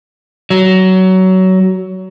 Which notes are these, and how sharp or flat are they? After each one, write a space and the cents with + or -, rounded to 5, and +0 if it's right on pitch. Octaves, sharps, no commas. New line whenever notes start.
F#3 +20